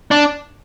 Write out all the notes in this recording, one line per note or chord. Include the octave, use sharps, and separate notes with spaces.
D4